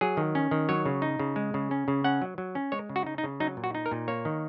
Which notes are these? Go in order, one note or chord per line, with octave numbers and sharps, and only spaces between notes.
F#3 G#4
D#3
C#4
D#3
F#3 C#5
C#3
D#4
C#3
G#3
C#3
C#4
C#3
C#4 F#5
F#3
F#3
C#4
G#3 C#5
C#3
F#4
D#4
D#4
C#3
F#3 D#4
A#2
F#4
D#4
A#4
A#2
A#3 C#5
D#3